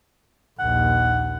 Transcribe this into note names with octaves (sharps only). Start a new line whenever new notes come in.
A#1 D#2 F#5